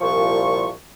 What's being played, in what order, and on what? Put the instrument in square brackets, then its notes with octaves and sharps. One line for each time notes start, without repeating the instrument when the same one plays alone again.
[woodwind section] C2 A#2 F3 C#6